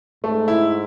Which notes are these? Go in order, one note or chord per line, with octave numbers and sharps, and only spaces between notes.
G#2 A3
E4